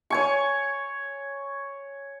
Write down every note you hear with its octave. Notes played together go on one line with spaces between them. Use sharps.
C#5 G#5 C#6